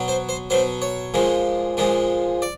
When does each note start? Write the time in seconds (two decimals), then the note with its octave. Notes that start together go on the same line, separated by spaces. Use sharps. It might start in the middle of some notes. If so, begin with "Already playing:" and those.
Already playing: B2 F#3
0.08 C5
0.29 C5
0.50 B2 F#3 C5
0.82 C#5
1.14 A#2 F3 G#3
1.77 A#2 F3 G#3
2.42 D5